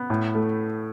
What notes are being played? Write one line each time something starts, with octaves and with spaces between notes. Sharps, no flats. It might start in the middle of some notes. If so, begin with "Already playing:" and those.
Already playing: B3
A2
A3